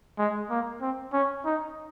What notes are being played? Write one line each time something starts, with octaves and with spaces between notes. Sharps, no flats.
G#3
A#3
C4
C#4
D#4